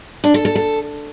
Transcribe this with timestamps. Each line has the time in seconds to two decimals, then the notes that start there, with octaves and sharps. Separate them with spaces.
0.24 D4
0.34 A4
0.45 A4
0.55 A4